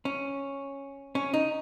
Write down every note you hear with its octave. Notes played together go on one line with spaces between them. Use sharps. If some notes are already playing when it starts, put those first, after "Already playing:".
C#4
C#4
D#4